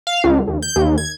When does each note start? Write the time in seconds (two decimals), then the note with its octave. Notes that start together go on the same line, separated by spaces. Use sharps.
0.07 F5
0.24 C#2
0.47 D#2
0.63 G6
0.76 D#2
0.98 G#6